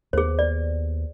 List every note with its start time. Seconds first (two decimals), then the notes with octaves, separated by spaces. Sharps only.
0.13 D#2 B3 G#4 C5
0.39 D5